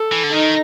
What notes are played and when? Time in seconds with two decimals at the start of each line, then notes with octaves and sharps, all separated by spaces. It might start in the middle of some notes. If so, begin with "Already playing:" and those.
Already playing: A4
0.12 E3
0.23 D3
0.32 D#3 D#4